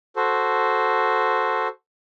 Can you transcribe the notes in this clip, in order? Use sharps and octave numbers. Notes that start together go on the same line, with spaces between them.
F#4 A4 C5